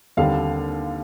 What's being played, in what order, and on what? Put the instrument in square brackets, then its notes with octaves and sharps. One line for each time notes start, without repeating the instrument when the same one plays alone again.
[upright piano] D#2 D3 G3 C4 F5